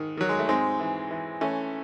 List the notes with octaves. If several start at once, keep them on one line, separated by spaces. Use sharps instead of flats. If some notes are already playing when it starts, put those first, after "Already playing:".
Already playing: G#2 D#3
D#3 F#3
G#3
A3
G#2 G#3 C4
E3
E3
E3 A3 C#4